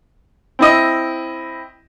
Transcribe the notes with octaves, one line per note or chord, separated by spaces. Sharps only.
C4 E4 D#5